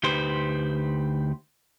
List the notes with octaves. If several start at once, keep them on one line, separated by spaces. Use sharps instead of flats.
D2 D#4 G4 B4 C5